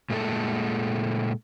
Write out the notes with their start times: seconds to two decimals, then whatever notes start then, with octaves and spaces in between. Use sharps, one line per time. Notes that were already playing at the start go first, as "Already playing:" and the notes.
0.10 A#2 G#3 A3 E4 A4